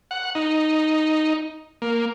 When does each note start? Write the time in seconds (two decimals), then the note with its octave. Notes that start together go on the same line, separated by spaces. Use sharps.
0.11 F#5
0.35 D#4
1.82 A#3